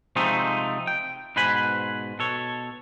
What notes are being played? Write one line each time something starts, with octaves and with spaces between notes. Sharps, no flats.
C3 F3 G#3 A3 C4 D#4
G5
G#2 B2 B4 C5 G#5 B5
B2 A4 C#5